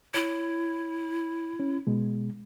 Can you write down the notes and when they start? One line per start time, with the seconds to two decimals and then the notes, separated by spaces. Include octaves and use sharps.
0.14 E4 C#5
1.60 C#4
1.87 B2 G#3